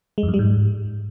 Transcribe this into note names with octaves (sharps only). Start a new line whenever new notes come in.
G#3
F2
F#2
G3
G#2